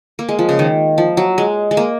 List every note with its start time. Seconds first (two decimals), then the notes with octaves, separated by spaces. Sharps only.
0.19 A#3
0.29 G#3
0.39 F3
0.49 C#3
0.59 D#3
0.98 F3
1.17 F#3
1.38 G#3
1.71 G#3
1.77 A#3